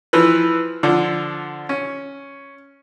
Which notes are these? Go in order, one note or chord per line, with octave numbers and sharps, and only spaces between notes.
E3 F3 B4
D3 F3
C#4